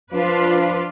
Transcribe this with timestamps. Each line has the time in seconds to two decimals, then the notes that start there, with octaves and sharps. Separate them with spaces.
0.12 F3 D4 F4 B4